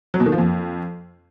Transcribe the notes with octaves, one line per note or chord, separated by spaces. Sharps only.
F#3
B2
D#3
F3
F2